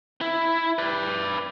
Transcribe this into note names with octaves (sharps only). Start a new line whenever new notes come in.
E4
B4 D5